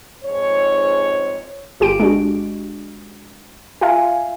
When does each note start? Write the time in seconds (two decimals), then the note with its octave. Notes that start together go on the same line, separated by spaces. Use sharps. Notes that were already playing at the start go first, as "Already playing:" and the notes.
0.24 F2 G#2 C#5
1.80 G1 F4 G4 D7
1.99 G#3 D4 F#4
3.81 F4 E5 F5 G#5